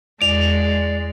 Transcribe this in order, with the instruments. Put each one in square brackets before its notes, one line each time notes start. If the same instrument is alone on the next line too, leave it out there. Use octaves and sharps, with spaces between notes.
[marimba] E2 [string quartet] G#3 [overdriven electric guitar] D5 [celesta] F7